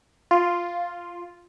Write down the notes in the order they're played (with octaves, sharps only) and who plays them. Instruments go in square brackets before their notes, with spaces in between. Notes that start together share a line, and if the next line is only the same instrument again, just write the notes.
[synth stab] F4